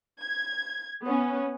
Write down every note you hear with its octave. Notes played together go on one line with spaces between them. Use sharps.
G#6
B3 C#4